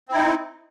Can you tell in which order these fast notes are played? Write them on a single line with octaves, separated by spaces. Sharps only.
C4 E4 D#4